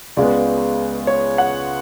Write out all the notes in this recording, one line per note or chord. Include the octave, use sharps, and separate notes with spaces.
C#2 C#3 G#3 B3 D5
C#5
F#5